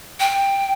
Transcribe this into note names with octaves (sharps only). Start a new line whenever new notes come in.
G5